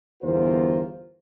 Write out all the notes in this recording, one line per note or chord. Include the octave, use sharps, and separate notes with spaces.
G1 E2 F4 A#4 C5